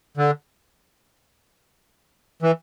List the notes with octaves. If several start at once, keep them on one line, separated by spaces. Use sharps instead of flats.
D3
E3